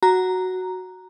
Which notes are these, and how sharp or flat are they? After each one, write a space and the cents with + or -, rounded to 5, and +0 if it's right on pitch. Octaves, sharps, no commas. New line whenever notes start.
F#4 +0 A#5 +0